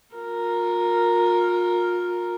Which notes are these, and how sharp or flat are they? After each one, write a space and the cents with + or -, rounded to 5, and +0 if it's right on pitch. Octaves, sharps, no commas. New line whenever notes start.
F4 +35 A#4 +0